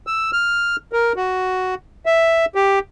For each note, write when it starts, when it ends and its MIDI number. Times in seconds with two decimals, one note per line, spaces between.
0.07 0.31 88
0.33 0.76 89
0.93 1.13 70
1.16 1.75 66
2.06 2.45 76
2.55 2.79 67